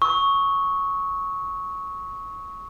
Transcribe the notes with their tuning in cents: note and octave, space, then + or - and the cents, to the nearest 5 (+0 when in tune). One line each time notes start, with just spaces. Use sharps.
C#6 +0 E6 -40